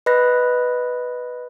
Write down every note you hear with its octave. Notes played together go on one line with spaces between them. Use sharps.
B4 D#5 B5 F#6 A#6